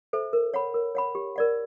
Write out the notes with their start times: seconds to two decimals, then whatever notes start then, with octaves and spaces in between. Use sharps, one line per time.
0.13 A4 C5 E5
0.33 A#4
0.54 C#5 F#5 B5
0.74 A#4
0.95 C#5 F#5 B5
1.15 G4
1.36 A#4 D5 F#5